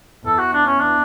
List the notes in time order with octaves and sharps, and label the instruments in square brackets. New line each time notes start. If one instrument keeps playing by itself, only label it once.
[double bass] E2 [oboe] A4
[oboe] F#4
D4
C#4
D4